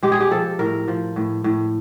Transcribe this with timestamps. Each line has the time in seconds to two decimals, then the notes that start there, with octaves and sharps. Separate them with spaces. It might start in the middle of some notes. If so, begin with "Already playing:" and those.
0.03 G#3 G4
0.12 G#4
0.20 G4
0.31 F3 A4
0.59 A2 A#4
0.88 F3
1.16 A2
1.44 A2